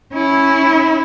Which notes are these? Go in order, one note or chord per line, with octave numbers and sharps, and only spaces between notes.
C#4 E4